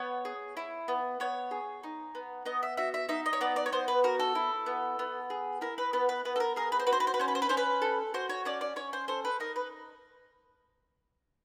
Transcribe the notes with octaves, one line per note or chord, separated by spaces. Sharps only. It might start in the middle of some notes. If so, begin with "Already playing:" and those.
Already playing: B3 C#5
G#4
E4
B3
B3 C#5
G#4
D#4
B3
B3 D#5
E5
F#4 E5
E5
D#4 E5
D#5
C#5
B3 D5
D5
C#5
B3 C5
B4
F#4 A#4
A4
E4
B3
B3
G#4
E4 A#4
B4
B3 B4
B4
B3 B4
A4
A#4
G#4 A#4
B4
C5
F#4 B4
C5
B4
C5
B4
C#4 C5
B4
C5
B4
C#4 C5
B4
A4
F#4 C5
C#5
C#4 D5
D5
C#4 C#5
C5
A4 C5
B4
D#4 A#4
B4